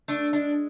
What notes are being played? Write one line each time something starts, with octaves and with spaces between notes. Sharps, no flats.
A3 D4
G#3 D4